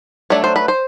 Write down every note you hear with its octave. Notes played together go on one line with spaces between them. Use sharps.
F#3 A3 D4 C#5
C5
B4
C5